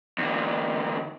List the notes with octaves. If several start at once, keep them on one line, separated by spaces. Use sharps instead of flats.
E2 D3